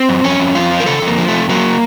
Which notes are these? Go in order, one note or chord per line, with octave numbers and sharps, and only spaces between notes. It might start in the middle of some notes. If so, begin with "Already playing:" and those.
Already playing: C4
F#2
F2 C#4
F2
F2 F4
F3
A#4
C#3 A4
F2
A#3
F3
A3
F2
F#3 A#3